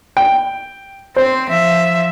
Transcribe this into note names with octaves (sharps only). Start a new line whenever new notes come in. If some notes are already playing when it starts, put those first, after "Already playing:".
G5
C4 C5
F3 E5